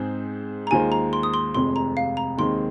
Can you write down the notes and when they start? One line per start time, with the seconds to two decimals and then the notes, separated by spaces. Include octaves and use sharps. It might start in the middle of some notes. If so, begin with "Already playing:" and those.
Already playing: G#2 G#3 C4 G#4 C5
0.67 A#5
0.71 D#2 D#3 G#3 F4 C5 G#5
0.92 A#5
1.13 C6
1.23 D#6
1.34 C6
1.55 F1 F2 C3 G#3 C6
1.76 A#5
1.97 F5
2.17 A#5
2.37 D#2 D#3 G#3 C4 C6